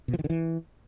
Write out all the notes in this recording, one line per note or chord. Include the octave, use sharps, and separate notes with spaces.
B2
F3
D#3
D3
E3